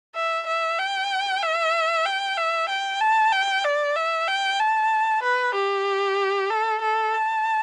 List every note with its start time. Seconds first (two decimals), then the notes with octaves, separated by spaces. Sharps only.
0.15 E5
0.47 E5
0.79 G5
1.42 E5
2.06 G5
2.37 E5
2.69 G5
3.00 A5
3.32 G5
3.64 D5
3.96 E5
4.28 G5
4.60 A5
5.23 B4
5.55 G4
6.50 A4
6.82 A4
7.14 A5